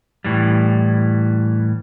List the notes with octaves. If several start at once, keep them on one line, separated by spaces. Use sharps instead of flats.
A2 E3 G3